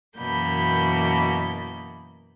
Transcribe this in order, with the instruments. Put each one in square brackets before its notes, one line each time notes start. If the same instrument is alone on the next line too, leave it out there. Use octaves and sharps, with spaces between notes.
[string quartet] F#2 B2 E3 A#3 B5 G6